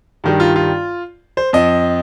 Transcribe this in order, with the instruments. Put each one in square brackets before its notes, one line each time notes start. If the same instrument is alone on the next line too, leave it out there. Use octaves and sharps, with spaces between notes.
[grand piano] G2 D#3 G3
F4
F4
C5
F2 F3 D#5